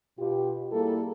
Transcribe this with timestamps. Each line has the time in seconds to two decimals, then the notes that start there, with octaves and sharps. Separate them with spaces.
0.19 B2 F4 G4
0.72 G3 A#3 E4 G#4 A4